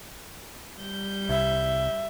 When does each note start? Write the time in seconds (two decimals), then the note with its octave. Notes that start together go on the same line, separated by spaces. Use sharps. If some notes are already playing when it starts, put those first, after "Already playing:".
0.80 G3 G6
1.29 C2 E5